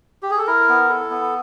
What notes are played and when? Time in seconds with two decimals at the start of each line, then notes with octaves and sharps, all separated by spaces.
0.23 G4
0.31 G#4
0.38 A4
0.47 E4 A#4
0.69 B3
0.89 E4 A4
1.11 B3